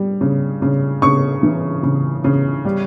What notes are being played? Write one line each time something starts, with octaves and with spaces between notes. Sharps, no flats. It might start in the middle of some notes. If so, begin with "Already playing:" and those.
Already playing: G3
C#3
C#3
C#3 C#6
E3
C#3
C#3
G3